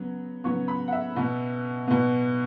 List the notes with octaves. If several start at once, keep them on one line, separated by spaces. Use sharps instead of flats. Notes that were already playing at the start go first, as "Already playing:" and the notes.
Already playing: C#3 F#3 B3
C#3 F#3 B3 C#6
B5
F#5
E5
B2 B3
B2 B3